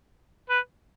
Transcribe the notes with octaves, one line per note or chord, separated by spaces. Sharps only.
B4